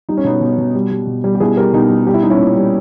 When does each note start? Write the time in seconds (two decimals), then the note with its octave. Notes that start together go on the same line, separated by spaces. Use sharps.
0.09 G3 D#4
0.17 C#4
0.24 B2 B3 D#4
0.41 B2
0.58 B2
0.75 G3
0.91 G3
1.07 B2
1.24 G3
1.35 G4
1.40 B2 E4 G#4
1.57 G3 G4 A#4
1.73 B2 D#4 G4
1.90 G3
2.06 G3 G4
2.14 E4
2.22 G3 D#4
2.30 C#4 E4
2.39 A#2
2.56 G3